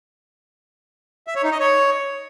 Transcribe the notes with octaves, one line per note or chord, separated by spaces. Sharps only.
E5
C#5
D#4
D#5
C#5